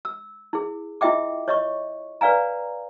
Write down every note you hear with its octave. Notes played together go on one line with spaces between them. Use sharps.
E6
E4 G#4
E4 F4 D#5 E5 G5 D6
C#5 D#5 C#6
B4 D5 F5 G#5 A#5